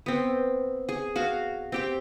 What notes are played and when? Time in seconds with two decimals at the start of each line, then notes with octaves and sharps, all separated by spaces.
0.06 B3 C4
0.89 G#4
1.16 F#4 F5
1.72 C4 G4 G5